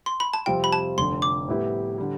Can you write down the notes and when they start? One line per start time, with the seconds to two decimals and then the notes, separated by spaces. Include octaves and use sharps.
0.06 C6
0.20 B5
0.34 A5
0.46 F2 C3 G3 C4 F4 G5
0.64 B5
0.73 A5
0.98 F1 F2 D3 C6
1.22 D6
1.48 A2 G3 B3 E4 G4
1.98 D3 G3